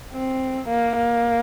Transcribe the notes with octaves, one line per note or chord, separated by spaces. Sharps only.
C4
A#3
A#3